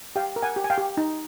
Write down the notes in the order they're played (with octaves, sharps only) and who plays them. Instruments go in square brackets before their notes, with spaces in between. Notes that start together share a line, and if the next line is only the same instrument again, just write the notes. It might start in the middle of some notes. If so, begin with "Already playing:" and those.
[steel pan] G4 F5 G5
A#4
F#5 G#5
G4
G#5
F5 G5
G4
D#4